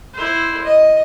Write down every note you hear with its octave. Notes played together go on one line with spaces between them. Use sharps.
E4 C5
D#5